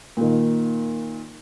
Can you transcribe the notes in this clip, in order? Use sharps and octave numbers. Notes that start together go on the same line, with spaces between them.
A#2 D#3